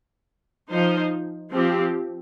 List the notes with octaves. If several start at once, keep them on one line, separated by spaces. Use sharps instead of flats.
F3 D#4 C5
F3 C4 G4